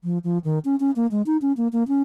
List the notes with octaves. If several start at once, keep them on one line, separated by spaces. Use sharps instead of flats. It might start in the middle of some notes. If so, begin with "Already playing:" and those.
F3
F3
D#3
C#4
C#4
A#3
G#3
D#4
C#4
A#3
A#3
C#4